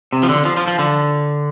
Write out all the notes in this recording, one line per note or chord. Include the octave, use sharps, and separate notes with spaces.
C3
F3
D3
F3
F3
F3
D3